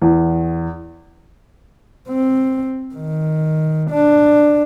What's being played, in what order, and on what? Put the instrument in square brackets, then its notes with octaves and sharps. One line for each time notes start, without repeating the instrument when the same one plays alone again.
[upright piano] E2
[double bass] C4
D#3
D4